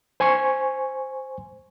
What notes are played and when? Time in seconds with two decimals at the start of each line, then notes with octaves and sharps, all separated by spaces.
0.20 C5 G#5 C6 C#6